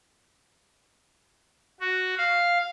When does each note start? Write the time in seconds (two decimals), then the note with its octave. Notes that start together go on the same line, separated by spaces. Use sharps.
1.80 F#4
2.18 F5